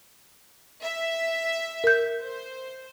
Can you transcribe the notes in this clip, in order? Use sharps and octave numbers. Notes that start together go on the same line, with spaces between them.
E5
A#4 G6
C5